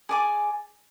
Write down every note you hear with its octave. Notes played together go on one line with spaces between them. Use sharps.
G#4 D5 G#5 D6